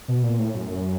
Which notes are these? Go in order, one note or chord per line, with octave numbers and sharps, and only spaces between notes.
B2
A#2
A2
F#2